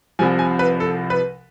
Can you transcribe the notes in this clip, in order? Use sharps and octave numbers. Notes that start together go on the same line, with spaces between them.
C2 C3 F3 G#5
G#5
B4
A4
B4